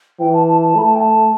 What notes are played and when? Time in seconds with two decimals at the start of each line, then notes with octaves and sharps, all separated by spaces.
0.20 E3 G5
0.33 A5
0.47 A5
0.61 A5
0.75 A3 B5
0.82 A5
0.95 G5
0.99 A5